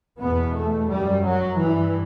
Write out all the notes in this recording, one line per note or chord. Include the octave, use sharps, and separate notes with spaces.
E2 B2 B3
A3
F#2 G3
F#3
G2 E3